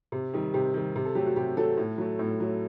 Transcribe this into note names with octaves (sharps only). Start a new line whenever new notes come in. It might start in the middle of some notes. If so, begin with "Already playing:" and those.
C3
D#3 G3
C3 G4
D#3 G3
C3
A4
F#3 A3 G4
F#4
C3 G4
F#3 A3 A4
A2
F#3 A3
A2
F#3 A3